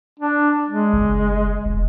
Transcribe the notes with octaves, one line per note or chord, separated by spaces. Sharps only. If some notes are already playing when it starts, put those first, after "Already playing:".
D4
G#3
F#1
E1